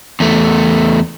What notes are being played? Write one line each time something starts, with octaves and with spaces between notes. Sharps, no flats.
E2 A3